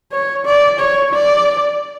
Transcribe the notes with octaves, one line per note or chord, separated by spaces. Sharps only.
C#5
D5
C#5
D5